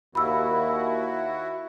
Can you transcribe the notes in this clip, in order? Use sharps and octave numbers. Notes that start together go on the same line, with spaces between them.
D#2 E4 F#4 B5 E6